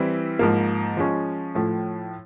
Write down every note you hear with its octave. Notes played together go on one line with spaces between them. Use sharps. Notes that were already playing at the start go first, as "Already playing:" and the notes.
Already playing: E3 G3 C4 E4
G#2 F3 A#3
F3 G#3 C#4
A2 F3 A3